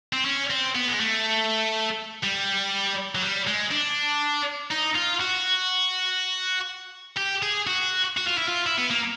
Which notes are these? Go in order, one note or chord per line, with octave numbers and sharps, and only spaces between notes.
C4
C#4
C4
B3
G#3
A3
G3
F#3
G3
G#3
D4
D#4
F4
F#4
G4
G#4
F#4
F#4
F4
E4
F4
E4
B3
A#3